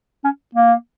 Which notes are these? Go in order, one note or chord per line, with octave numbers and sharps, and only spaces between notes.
C#4
A#3